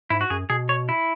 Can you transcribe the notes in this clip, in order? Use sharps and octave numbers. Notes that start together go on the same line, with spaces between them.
G#2 E4
F#4
F#2 G#4
B2 G#4
C#5
E4